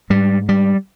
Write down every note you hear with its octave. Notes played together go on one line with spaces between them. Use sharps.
G#2 G3
G3